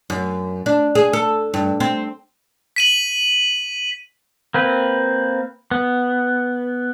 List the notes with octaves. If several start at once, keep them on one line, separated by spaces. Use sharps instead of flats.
F#2
D4
G#4
A4
G2
C4
B6 D#7 F#7
A#3 C4 B4
B3